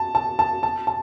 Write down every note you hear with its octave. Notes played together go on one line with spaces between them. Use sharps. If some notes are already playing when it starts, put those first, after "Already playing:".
Already playing: A5
A5
A5
A5
A5